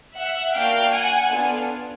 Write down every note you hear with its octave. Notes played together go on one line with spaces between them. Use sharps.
E5 F#5
A#3 D4 F#4 F5 G5
F#5 G#5
B3 D4 F4 A4